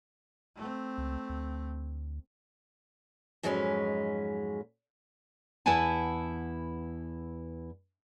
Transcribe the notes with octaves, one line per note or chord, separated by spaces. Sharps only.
A3 C4
C#2
D2
F2 G#2 F#3 G#3 C#4 B4
E2 E4 B4 F#5 G#5 A5